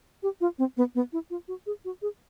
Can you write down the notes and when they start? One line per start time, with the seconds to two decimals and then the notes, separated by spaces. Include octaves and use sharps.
0.23 G4
0.41 F4
0.58 C4
0.77 B3
0.95 B3
1.13 E4
1.30 F4
1.48 F#4
1.66 G#4
1.85 F#4
2.02 G#4